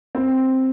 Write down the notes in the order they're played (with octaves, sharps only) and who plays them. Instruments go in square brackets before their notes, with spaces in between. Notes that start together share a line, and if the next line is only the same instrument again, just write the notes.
[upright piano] C4